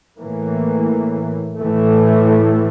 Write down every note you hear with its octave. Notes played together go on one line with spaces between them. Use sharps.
A2 E3 A#3
A2 E3 A3